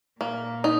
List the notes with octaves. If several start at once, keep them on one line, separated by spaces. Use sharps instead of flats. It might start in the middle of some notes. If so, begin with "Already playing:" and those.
A#2 A#3
D#4